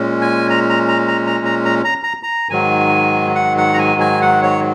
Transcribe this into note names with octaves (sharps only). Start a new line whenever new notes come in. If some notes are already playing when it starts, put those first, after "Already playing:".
Already playing: A#2 G#3 C#4
G#5
A#5
A#5
A#5
A#5
A#5
A#5
A#5
A#5
A#5
A#5
G#2 D#3 F#3 G#5
F#5
F#5
A#5
G#5
G#5
F#5
C#5